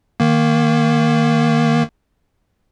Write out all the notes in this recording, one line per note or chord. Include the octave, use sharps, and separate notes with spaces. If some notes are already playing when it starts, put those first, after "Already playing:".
D#3 A#3